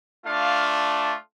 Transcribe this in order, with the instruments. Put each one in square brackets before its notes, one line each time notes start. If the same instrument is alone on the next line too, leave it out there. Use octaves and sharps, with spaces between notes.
[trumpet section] A3 D4 F4 F5